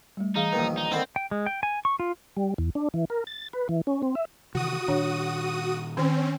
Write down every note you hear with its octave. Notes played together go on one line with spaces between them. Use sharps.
G3 A3
E3 D#4 G#4 F5
A#1 D#3 A#3 B4
D#4
D3 D#3 C4 B5
G5
G#3
G5
G#5
C#6
F4
G3
E2
D4
E3
A#4
A6
B4
E3
C#4
C4
E5
C3 D#3 E3 F#4 D#6 D#7
A#2 D#3 D4 C#5
D#3 C4 C#4